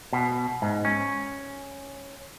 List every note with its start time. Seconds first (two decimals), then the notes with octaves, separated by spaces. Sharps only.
0.13 B2
0.62 G#2
0.85 C#4